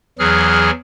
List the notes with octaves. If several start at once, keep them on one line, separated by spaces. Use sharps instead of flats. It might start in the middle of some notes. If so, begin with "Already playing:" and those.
E2 E3 F#3 G#4 F6